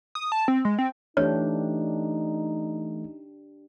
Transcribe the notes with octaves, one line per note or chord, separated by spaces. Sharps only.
D#6
A5
C4
G#3
C4
E3 A3 D4 D#4 G4 C#5